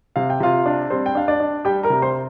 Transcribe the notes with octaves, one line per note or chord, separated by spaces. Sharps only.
C3 F5
G5
C3 F4 F5
D4
G3 C4 C5
G5
D4 F5
D4 D5
D4
G3 G4 G5
A#4 A#5
C3
C5 C6